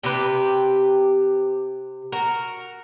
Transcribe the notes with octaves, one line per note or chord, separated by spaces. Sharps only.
C3 G4 B4
F#4 A#4